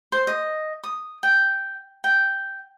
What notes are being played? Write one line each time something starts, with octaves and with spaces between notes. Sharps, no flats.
C5
D#5
D#6
G5
G5